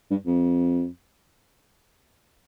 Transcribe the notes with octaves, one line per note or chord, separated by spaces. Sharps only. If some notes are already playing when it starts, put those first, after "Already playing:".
G2
F2